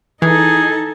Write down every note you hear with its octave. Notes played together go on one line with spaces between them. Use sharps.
E3 D#4 G#4 A4